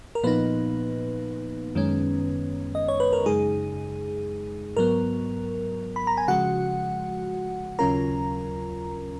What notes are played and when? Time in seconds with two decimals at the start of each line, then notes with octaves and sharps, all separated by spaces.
0.15 A#4
0.23 A#2 F3 A#3 B3 D#4 B4
1.75 F#2 D#3 G#3 C#4
2.75 D#5
2.88 C#5
3.00 B4
3.13 A#4
3.26 F#2 C#3 G#3 D#4 G#4
4.77 G#2 F#3 B3 A#4
5.96 B5
6.07 A#5
6.17 G#5
6.28 C#3 F3 G#3 F#4 F#5
7.79 D#2 C#3 F#3 C#4 F4 A#4 A#5